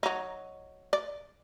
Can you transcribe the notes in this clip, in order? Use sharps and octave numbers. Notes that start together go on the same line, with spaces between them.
F#3 D#4
D5